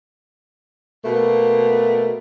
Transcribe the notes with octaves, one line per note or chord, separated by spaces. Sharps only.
B2 A3 A#3